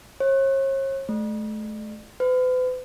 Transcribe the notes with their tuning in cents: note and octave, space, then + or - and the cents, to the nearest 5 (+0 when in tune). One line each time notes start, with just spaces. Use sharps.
C#5 -40
A3 -35
B4 +45